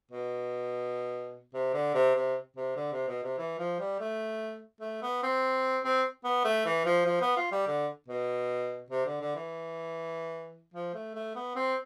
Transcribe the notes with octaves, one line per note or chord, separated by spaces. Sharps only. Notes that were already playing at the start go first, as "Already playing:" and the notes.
B2
C3
D3
C3
C3
C3
D3
C3
B2
C3
E3
F3
G3
A3
A3
B3
C4
C4
B3
A3
E3
F3
F3
B3
F4
G3
D3
B2
C3
D3
D3
E3
F3
A3
A3
B3
C4